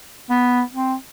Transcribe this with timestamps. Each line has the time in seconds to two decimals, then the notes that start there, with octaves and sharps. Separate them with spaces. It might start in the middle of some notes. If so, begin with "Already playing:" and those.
0.30 B3
0.74 C4